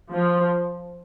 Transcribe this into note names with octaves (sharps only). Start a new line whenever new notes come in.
F3